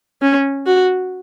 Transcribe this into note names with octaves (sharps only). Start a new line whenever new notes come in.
C#4
F#4